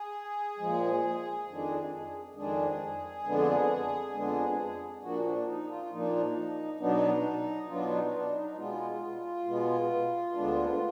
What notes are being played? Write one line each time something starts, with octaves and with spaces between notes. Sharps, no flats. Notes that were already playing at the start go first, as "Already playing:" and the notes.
Already playing: G#4
A#2 F3 G#3
F2 D#3 G#3 D4
F2 D#3 G#3 D4 G#4
F2 D3 G#3 B3 D4
F2 D3 G#3 B3 D4
A#2 F3 A#3 D4 F#4
D4
D#4
F4
A#2 F3 A#3 D4 D#4
B2 F#3 B3 D4 D#4
B2 F#3 B3 D4 F4
D#4
D4
D#4
D#4
B2 G#3 B3 F4
B2 G#3 B3
D2 D3 G#3 B3 D4